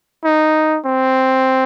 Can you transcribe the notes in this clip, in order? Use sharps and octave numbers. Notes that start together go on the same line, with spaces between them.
D#4
C4